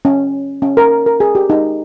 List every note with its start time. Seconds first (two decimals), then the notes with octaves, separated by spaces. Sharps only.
0.05 C#4
0.62 C#4
0.77 A#4
1.06 A#4
1.20 G#4
1.35 G4
1.50 D#4